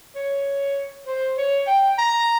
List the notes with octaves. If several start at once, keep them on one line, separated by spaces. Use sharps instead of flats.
C#5
C5
C#5
G5
A#5